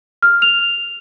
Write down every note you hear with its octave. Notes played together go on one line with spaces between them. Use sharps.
F6
F7